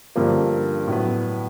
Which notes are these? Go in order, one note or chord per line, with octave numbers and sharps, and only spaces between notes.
G2 D3 F3 A#3
A2 F#3 B3